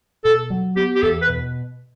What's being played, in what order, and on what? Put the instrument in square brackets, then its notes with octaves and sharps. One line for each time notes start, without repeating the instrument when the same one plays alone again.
[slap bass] B2 [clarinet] A4
[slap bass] F#3
[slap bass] B3 [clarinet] G4
[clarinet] G4
[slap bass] E2 [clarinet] A4
[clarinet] B4
[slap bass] B2